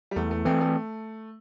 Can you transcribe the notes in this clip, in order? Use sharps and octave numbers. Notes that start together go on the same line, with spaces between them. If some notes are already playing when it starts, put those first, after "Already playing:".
G3
E2 A3
A3
E3 A3 C4
A3